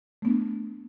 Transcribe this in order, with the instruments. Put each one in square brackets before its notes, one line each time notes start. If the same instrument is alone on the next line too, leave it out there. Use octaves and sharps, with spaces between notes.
[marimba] A3
B3
D4